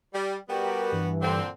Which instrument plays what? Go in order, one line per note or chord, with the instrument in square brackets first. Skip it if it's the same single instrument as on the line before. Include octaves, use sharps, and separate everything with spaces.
[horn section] G3
[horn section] G3 B3 F#4 [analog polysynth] G4 A#4 G5
[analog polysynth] G2 E3
[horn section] A#2 D3 C4